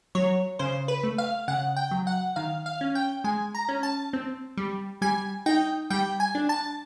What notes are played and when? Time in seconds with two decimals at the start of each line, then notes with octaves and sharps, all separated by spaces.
0.15 F#3 C#5
0.59 C#3 C5
0.88 B4
1.03 A3
1.18 F5
1.48 C#3 F#5
1.76 G5
1.91 F#3
2.07 F#5
2.36 D#3 F5
2.66 F5
2.81 C#4
2.95 G5
3.24 G#3 G#5
3.55 A#5
3.69 C#4
3.83 A5
4.13 C4
4.57 G3
5.02 G3 G#5
5.46 D#4 G5
5.90 G3 G5
6.20 G#5
6.35 D4
6.49 A5